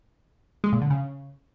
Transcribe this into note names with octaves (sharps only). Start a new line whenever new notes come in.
G#3
A#2
D3
C#3